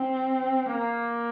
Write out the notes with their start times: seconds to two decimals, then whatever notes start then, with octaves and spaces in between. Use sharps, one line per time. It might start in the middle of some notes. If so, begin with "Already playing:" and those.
Already playing: C4
0.73 A#3